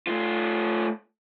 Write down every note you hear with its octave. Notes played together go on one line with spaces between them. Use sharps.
A3 F4